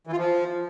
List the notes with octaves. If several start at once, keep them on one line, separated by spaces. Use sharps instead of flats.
E3
F4
F3